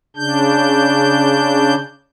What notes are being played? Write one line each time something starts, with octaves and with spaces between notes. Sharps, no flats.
C#3 D4 G6